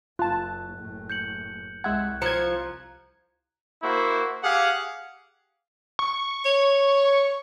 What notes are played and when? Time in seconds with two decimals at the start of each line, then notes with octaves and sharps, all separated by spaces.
0.19 F#1 F4 A5 F#6
0.77 F#1 A2
1.10 G6 C#7 F#7
1.84 C2 G#3 E5 F#5 F#6 G#6
2.22 F3 A#5 G#6 C#7
3.83 A#3 E4 F#4 C5
4.43 G4 G#4 F5 F#5
5.99 C#6
6.45 C#5